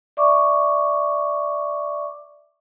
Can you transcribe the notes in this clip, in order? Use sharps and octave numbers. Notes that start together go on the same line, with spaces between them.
D5 E5 C#6 D6